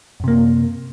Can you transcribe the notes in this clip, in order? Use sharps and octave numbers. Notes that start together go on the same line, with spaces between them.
F#2 C3 A#3